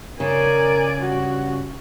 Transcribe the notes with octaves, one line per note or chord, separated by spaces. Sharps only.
C#3 A#4 D5 G#5
G2 F#4